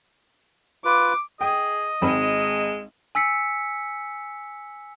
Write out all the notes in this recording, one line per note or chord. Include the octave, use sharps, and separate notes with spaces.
F4 B4 D6
G#4 D#5 G5
G#1 G#3 C4 B5
G#5 E6 B6 C#7